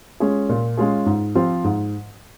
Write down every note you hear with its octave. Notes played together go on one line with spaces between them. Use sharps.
G#3 C#4 F4 G#4
A#2
G#3 C#4 F4 G#4
G#2
F3 C4 F4
G#2